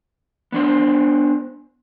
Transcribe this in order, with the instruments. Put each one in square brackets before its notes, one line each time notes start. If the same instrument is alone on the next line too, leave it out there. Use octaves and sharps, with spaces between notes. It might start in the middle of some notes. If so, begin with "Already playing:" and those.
[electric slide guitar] B3 D4 C5